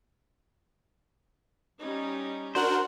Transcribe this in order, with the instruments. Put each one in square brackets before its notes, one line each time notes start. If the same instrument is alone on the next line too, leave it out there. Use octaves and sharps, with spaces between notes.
[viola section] G3 C#4 D#4
[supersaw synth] D4 F#4 A#4 [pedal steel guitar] C5 F#5